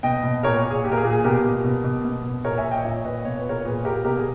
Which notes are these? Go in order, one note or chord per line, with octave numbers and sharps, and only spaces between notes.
B2 D#5 G5
B2
A#2 A#4 C#5
A#2
G#4
A#2 G4
A#4
G#4
A#2
G#4
B2 G4 A#4
B2
B2
B2
B2
B2
A#2 A#4 C#5
E5 G#5
A#2
D#5 G5
A#2 C#5 E5
A#2 B4 D#5
B2 C#5
B4
B2 A#4 C#5
A#2 G#4 B4
A#2 G4 A#4
B2 G4 A#4
G#4